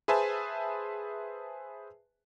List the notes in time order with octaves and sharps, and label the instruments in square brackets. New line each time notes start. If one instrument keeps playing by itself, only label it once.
[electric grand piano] G#4 B4 C5 E5 G#5 A5